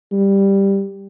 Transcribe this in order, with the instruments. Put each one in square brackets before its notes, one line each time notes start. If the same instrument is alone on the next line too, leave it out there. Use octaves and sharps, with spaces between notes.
[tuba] G3